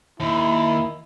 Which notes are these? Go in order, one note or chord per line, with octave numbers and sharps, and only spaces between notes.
D#2 E4